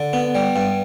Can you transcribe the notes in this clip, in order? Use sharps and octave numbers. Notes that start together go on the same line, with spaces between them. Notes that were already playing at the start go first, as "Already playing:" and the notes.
Already playing: D3
B3
G3
G2